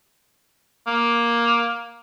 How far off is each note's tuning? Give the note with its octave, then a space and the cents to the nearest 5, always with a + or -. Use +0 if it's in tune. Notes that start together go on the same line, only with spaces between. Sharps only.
A#3 +10